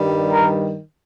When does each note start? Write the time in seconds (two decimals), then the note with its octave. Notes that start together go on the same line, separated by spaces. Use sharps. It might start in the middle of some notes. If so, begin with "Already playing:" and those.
Already playing: G2 D#3 G3
0.33 A#4